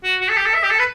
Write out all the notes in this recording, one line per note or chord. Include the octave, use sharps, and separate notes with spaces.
F#4
F#4
A4
G4
A4
E5
G4
A4
B4